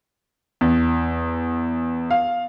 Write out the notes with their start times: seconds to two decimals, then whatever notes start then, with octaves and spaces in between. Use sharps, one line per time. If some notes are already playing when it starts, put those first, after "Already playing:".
0.61 E2
2.11 F5